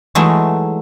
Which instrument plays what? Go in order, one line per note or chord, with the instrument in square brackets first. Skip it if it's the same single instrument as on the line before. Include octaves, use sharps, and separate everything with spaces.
[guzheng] E3 F#3 G#3 A3 D#4